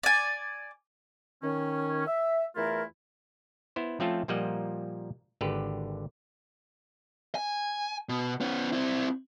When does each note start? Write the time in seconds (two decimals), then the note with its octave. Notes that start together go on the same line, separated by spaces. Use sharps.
0.03 D5 G#5
1.43 D#3 C#4
2.07 E5
2.56 E2 E3 A3 E4 F4 A#4
3.76 B3 E4 C5
4.00 F3 A3 C4 C#4 F4 A4
4.28 A#2 F3 G3 A#3 D#5 F#5
5.41 G#1 D3 G4 B4
7.35 G#5
8.09 B2
8.41 B3 C#4
8.72 C4 E4